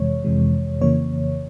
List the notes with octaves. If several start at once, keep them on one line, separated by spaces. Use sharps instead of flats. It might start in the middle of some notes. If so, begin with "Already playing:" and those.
Already playing: F2 C3 E3 G#3 C#5
F2 C3 E3 G#3
F2 C#3 E3 A#3 C#5